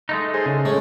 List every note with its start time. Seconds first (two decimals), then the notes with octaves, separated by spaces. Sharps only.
0.09 G#3 A3 D#4
0.34 G#4 C5
0.46 C#3
0.65 A2 G#3 C#4